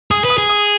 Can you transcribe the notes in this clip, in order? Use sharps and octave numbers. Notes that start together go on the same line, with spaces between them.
G#4 D#6
B4
D#6
G#4
D#6